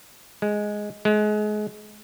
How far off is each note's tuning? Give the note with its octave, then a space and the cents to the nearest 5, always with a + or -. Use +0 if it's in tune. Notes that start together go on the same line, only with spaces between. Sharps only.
G#3 +5
G#3 +30